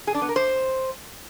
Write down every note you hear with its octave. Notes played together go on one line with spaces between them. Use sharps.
G#4
D4
B3
A#4
C5